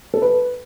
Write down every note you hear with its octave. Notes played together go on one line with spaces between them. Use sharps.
A4
B4